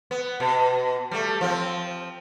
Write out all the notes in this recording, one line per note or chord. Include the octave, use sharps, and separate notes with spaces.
B3
B2
G3 A3
F3 C4